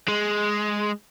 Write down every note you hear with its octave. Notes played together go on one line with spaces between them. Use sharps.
G#3